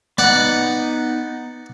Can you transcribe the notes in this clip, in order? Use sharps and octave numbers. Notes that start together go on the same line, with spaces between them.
B3 D#4 D5 F#5